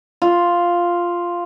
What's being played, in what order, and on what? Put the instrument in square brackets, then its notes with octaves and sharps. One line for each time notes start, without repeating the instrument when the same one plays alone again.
[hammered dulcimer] F4